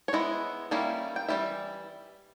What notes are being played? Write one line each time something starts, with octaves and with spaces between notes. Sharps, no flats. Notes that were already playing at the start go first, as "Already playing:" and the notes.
C#5
G#3 B3 E4 D#5
D#3 G3 A#3 C#4 E4
G5
E3 G3 C#4 E4 E5